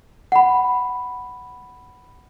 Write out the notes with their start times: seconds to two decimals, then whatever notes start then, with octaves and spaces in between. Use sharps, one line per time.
0.32 F#5 B5